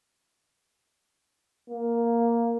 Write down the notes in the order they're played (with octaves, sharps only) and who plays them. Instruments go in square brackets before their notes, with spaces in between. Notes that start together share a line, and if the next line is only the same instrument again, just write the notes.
[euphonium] A#3